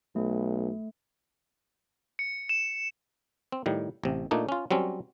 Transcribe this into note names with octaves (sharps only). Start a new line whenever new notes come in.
B1 A3
C#7
E7
C4
A2 D#3 G3
A1 C3
A#2 A3 D4 D#4
C#4 F4
F#3 G3 C4 C#4